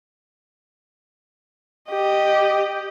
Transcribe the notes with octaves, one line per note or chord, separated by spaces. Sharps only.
G4 D#5